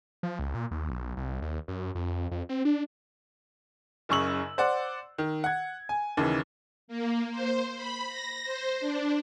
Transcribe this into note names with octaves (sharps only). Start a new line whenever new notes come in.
F3
C#2
A#2
D#2
B1
C2
D#2
F#2
F2
F2
C4
D4
F#1 F#2 C#3 C#6 E6 F#7
C5 D5 F#5
D#3
F#5 G#6
G#5
D#2 C#3 E3
A#3
C5
B5
A#6
C5
D4